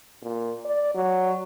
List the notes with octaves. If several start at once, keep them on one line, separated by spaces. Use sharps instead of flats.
A#2
D5
F#3